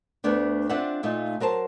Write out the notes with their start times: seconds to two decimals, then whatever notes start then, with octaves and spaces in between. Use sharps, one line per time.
0.24 D2 A3 B3 D4
0.69 C4 D4 F4 G#4 E5 F#5
1.03 A#2 A3 D#4 F4
1.40 F#3 A#4 C5 A5